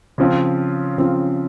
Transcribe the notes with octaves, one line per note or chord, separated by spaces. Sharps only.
C#3 F3 C4 F4
C#3 F3 C4 F4